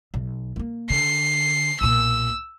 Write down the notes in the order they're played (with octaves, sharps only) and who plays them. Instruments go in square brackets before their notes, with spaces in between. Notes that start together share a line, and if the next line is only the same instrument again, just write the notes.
[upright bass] B1
A#3 B3
[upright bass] D3 [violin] C7
[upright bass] B1 A#2 [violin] E6